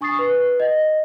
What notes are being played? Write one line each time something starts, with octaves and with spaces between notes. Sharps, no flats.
D4 G#5 C#6 D#6 A6 C7
B4
D#5